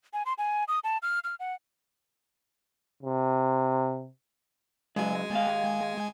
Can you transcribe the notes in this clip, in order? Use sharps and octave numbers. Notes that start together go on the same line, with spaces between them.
G#5
C6
G#5
D#6
A5
F6
F6
F#5
C3
C#3 F#3 G#3 G#5
D#2 A#3 F5